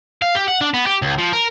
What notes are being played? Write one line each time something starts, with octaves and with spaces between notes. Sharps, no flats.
F5
G4
F#5
D4
B3
G4
C#2
F3
A#4